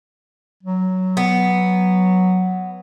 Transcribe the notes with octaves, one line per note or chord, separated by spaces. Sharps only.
F#3
B3